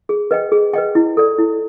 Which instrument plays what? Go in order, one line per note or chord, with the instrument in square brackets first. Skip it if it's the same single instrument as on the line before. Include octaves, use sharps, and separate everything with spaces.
[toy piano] G#4
B4 D#5 G5
G#4
B4 D#5 G5
E4
A4 D5
E4